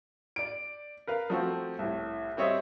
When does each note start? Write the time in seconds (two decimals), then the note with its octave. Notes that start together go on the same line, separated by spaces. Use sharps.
0.36 D5 D7
1.07 A#4 B4 F5
1.30 F3 A3 C4 F#4
1.79 C2 A2
2.37 G3 C4 C#5 D#5 E5